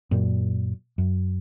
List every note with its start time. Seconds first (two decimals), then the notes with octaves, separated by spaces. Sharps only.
0.11 F#2 A#2
0.98 F#2